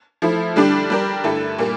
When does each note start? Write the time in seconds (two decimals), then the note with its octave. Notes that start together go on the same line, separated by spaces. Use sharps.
0.22 F3 A3 E4
0.56 D3 G3 D4 G4
0.90 G3 D4 G4 A#4
1.24 G2 D3 A3 E4 A4
1.58 A#2 G3 A#3